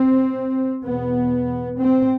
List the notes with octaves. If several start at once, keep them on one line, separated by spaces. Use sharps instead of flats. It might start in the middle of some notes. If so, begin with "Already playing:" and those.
Already playing: C4
E2 B2 B3
C4